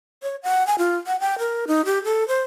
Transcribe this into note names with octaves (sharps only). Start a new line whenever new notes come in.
C#5
F#5
G#5
F4
F#5
G5
A#4
D#4
G4
A4
C5